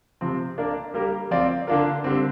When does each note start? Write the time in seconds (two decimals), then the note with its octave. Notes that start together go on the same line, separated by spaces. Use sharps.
0.21 C3 F3 C4
0.58 A#3 D4 A#4 D5
0.94 G3 A#3 G4 A#4
1.31 F3 C4 F4 D5
1.67 D3 A#3 D4 F4 A#4
2.04 D3 G3 C4